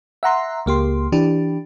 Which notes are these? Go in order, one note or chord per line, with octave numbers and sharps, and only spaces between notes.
E5 F#5 A#5 C6
C#2 A#3 G4 C6
E3 D4 G4